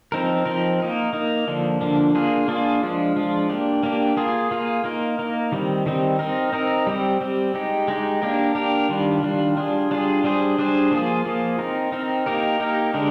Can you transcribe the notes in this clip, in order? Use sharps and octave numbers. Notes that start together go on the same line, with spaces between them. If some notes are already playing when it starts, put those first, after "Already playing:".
F3 C4 D#4 A#4
F3 C4 D#4 A#4
A#3 D#4 A#4
A#3 D#4 A#4
D3 F3 A#3 D4
D3 F3 A#3 D4
A#3 D4 F4 G#4
A#3 D4 F4 G#4
F3 G#3 D4 F4
F3 G#3 D4 F4
A#3 D4 G4
A#3 D4 G4
A#3 F4 G#4
A#3 F4 G#4
A#3 D#4 A#4
A#3 D#4 A#4
D#3 G3 C4 D#4
D#3 G3 C4 D#4
C4 D#4 A#4
C4 D#4 A#4
G3 C4 G4
G3 C4 G4
G#3 D#4 G4
G#3 D#4 G4
A#3 D4 G4 A#4
A#3 D4 G4 A#4
D#3 G3 D4 F4
D#3 G3 D4 F4
G3 D4 F4 G#4
G3 D4 F4 G#4
G3 D4 G#4 C5
G3 D4 G#4 C5
F3 A#3 F4 G#4
F3 A#3 F4 G#4
C4 D#4 A#4
C4 D#4 A#4
A#3 D#4 G4 A#4
A#3 D#4 G4 A#4
D3 G#3 D4 G4 A#4